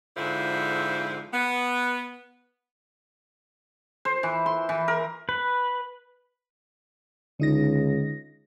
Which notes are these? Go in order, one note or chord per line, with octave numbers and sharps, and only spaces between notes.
F2 G#2 D3 E4 F4 C5
B3
C5
E3
C6
E3
A#4
B4
C#2 D3 D#4 A#6